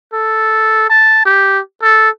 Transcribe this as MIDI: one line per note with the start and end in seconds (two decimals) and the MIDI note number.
0.13 0.89 69
0.90 1.24 81
1.26 1.60 67
1.83 2.10 69